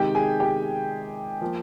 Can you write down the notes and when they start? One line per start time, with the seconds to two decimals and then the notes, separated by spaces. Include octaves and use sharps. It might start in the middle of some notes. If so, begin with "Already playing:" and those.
Already playing: C3 D#3 G#3 D#4 G4 G5
0.15 G#4 G#5
0.40 G4 G5
1.41 F3 A#3